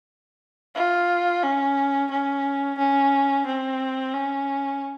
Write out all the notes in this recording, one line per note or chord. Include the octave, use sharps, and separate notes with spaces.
F4
C#4
C#4
C#4
C4
C#4